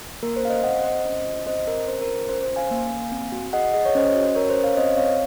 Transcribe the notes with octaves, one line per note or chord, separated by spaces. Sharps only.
A#3 A#4
C5
C#4 F5
C5 D#5
C4 D#5 F#5
C4 C5 D#5
C#4
F4
C4 C5 D#5
C4 A#4
C#4 C5
A#4
F4
C5
C#4 C5
C5
C#4
F5 G#5
A#3
A#3
C4
F#4
G#4 D#5 F#5
G#4 D#5
C#5
C#4 C5 D#5
F#4
C#4 A#4 C#5
C5
C#4
C#5 F5
C4 C5 D#5
C4 C#5 F5